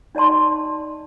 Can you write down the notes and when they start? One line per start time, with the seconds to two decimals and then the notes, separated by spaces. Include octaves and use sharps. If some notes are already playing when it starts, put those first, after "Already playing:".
0.15 D#4 D5 D#5 A5 C6